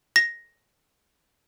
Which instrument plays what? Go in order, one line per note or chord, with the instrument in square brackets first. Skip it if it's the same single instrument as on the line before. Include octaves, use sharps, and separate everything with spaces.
[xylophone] A#6